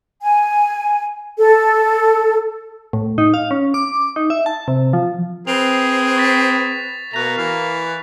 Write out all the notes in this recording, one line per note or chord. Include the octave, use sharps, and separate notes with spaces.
G#5
A4
A2
D#4
F5
C#4
D6
D#4
E5
A5
C3
F3
C4 G#4 B4 F7
C#6 A6 B6
B2 A#3 A#5 F#6 F7
E3 F5